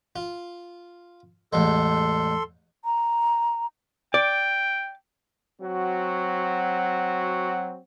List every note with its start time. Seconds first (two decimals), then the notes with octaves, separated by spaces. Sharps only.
0.16 F4
1.53 A1 E2 G#3 A4 C6
2.85 A#5
4.14 D5 G5
5.61 F#3 C4 F#4